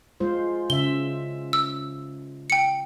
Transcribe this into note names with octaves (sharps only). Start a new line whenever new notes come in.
G#3 F4 C5
C#3 E5 G7
E6
G5 C#7